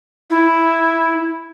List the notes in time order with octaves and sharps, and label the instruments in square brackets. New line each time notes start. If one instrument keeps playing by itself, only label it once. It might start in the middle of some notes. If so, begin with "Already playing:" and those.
[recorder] E4